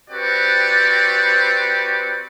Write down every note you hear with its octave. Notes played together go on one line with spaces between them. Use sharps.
C4 F#4 G4 B4 C5 D5